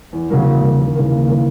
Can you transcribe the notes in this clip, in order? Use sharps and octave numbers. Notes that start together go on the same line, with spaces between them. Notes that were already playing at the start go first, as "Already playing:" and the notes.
E2
C#3 F#3 A#3
E2
C#3 F#3 A#3
D#2
C#3 E3 A#3
D#2
C#3 E3 A#3